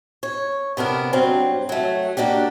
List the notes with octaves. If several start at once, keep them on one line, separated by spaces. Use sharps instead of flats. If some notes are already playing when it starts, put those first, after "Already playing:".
C#5
C3 B3 D4 A#4
G2 F#3 C4
F#3 A3
A#3 D4 F#4 G4